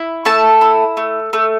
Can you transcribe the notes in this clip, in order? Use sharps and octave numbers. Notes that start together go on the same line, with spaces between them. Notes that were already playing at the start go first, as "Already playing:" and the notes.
Already playing: E4
A3 A5
E4
A3
A3